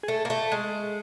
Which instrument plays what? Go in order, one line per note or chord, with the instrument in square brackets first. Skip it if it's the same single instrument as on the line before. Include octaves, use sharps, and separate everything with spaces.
[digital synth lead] G#4
[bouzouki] A3 [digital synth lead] A4
[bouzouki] A#3
A3
G#3